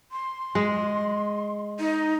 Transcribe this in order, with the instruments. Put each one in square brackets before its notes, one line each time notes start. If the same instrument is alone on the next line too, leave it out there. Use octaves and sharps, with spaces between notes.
[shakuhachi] C6
[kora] G#3
[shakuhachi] D#4